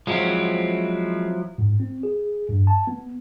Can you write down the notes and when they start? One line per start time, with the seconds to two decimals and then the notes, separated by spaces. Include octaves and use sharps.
0.07 F3 F#3 G#3 C4 E4
1.58 G#2
1.80 C4
2.03 G#4
2.49 G2
2.67 A5
2.87 B3